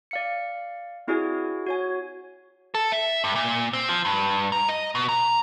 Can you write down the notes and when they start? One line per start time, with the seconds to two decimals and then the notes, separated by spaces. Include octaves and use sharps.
0.11 D5 F5 C#7
1.08 C4 E4 F#4 G#4 D5 G#5
1.67 F#4 C#5 G#5
2.74 A4
2.92 E5
3.24 G2
3.35 A#2
3.73 C4
3.89 F3
4.05 G2
4.52 A#5
4.69 D#5
4.95 B2
5.09 A#5